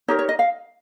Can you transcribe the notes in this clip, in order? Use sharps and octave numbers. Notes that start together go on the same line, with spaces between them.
D#4 G4 A#4 C#5
C#5
D#5
F5